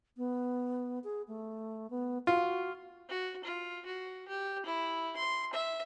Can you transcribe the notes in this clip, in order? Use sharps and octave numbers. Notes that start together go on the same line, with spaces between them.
B3
G#4
A3
B3
F4 F#4
F#4
F4
F#4
G4
E4
C6
E5